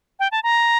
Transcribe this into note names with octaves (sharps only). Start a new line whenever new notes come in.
G5
A5
A#5